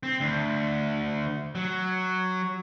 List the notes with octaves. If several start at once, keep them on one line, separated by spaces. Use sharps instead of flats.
C4
D2
F#3